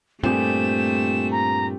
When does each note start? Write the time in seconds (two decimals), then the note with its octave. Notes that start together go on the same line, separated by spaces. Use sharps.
0.24 G2 A#2 A3 C4 G4 G#4 E7
1.31 A#5